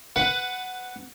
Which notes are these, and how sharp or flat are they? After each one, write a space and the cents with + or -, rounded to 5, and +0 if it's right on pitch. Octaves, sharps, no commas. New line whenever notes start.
B4 +15 F#5 +0